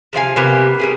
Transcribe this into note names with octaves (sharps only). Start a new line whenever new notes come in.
C3 F3 F5 G#5
C3 A#3 B3 G4
G3 G4 G#4